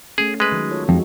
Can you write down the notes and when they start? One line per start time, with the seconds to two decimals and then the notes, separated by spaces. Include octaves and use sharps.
0.18 A3 C#4 G#4
0.40 G#3 B4
0.52 D#3 F#3
0.71 F4 A4 C#5
0.89 F2 F#3 G#3 D#4